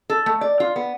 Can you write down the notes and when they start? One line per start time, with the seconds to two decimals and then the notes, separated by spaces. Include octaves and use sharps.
0.10 A4
0.26 A3
0.41 D5
0.60 F4
0.76 B3